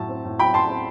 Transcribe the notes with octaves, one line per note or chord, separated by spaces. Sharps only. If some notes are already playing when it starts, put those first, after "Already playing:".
Already playing: A2 F#3 A5
C4
A2
F#3 G5 B5
A2 A5 C6
C4